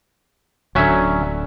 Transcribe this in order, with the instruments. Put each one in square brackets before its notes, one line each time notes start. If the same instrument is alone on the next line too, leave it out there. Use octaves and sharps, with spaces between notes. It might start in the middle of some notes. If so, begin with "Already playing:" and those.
[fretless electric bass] D1 D3 [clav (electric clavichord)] F#3 C#4 E5